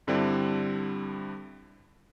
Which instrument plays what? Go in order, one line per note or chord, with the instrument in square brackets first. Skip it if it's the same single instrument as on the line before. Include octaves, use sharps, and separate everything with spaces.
[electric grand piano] G2 D3 G3 C4 D4 E4